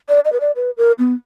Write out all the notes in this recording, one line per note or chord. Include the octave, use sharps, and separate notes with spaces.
D5
D#5
B4
D5
B4
A#4
B3